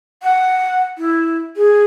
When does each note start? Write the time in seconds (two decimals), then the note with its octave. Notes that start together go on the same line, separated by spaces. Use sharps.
0.22 F#5
0.98 E4
1.57 G#4